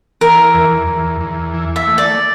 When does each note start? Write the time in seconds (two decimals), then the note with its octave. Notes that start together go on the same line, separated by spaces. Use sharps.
0.21 E3 A#4
0.55 E2
0.87 E2
1.21 E2
1.54 E3
1.76 E5
1.87 A3
1.98 D5